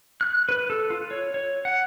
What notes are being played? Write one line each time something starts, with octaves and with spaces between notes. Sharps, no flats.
F#6
B4
A4
F4
C#5
C#5
F#5